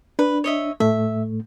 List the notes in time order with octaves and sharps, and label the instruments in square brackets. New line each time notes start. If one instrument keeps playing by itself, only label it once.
[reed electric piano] D4 [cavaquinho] B4
[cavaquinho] C#5 D#5 E5
[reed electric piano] A2 A3 [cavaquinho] E5